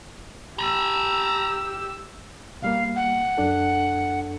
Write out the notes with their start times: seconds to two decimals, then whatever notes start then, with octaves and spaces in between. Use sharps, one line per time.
0.59 G4 A#5 B5 E6
2.62 B2 G3 A#3 F5
2.96 F#5
3.38 F#2 D4 A4